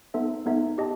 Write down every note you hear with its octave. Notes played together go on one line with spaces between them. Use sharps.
B3 D#4 A4 E5
B3 D#4 A4 E5
G4 D#5 A5